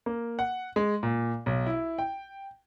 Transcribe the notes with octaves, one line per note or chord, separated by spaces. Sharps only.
A#3
F#5
G#3
A#2
B1
E4
G5